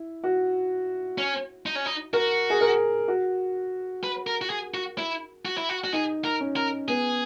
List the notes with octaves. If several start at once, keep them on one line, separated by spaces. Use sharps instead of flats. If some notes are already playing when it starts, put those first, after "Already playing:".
Already playing: E4
F#4
C#4
D#4
C#4
D#4
F#4 A#4
G#4
A#4
F#4
B4
A#4
F#4
G#4
F#4
E4
F#4
E4
F#4
F#4
D#4 G#4
A#4
C#4
A#4
B3 G#4